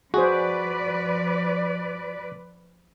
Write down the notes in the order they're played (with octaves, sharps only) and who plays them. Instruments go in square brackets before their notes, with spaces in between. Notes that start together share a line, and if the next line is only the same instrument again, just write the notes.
[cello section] F3 B4 D5 [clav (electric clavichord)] F#4 [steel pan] G#4 C5